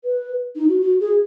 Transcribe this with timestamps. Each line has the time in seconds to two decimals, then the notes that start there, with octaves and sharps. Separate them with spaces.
0.04 B4
0.56 D#4
0.69 F#4
0.82 F#4
1.00 G#4